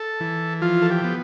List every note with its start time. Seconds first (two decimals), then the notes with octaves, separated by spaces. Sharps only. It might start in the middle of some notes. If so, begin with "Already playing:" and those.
Already playing: A4
0.20 E3
0.62 F3 F4
0.82 A4
0.90 G4
1.04 B3